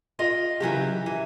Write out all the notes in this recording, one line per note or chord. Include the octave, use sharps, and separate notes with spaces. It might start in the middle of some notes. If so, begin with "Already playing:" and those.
F4 D#5 G5
C#3 E3 F#3 G4
E3